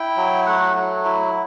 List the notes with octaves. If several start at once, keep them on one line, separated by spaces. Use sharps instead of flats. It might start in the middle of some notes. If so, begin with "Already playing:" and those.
Already playing: E4 G5
F#3
A3 F#5
F#3
E4